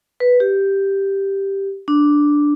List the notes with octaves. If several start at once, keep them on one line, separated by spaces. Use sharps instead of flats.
B4
G4
D4